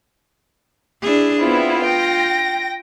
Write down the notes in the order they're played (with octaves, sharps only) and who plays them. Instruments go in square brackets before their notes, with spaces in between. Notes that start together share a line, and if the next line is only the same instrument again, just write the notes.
[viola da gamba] D4 E4 G#4
[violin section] B3 C4 E4 [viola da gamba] F4
[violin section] G5 A#6